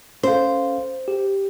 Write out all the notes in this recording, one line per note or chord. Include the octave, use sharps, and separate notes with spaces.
C#4 A4 C5 F5
G4